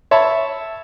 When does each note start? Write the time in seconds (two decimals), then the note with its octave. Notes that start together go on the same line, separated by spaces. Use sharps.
0.11 C#5 E5 A5 B5